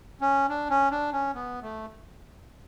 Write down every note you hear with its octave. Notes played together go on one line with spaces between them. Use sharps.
C#4
D4
C#4
D4
C#4
B3
A3